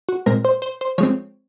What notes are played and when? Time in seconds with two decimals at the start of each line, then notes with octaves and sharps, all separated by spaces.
0.09 F#4
0.26 A#2 G#3 C4 A#4
0.45 C5
0.62 C5
0.81 C5
0.98 F3 G#3 C4 C#5